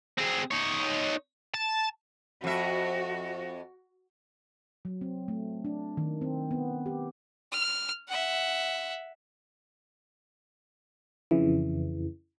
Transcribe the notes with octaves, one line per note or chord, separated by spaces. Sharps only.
C4 G#4
D#4 C#5
A5
F2 F#4 E5
F#3
C4
A3
D4
D#3
C4
B3
G4
F6
E5 F#5
F2 C#3 E3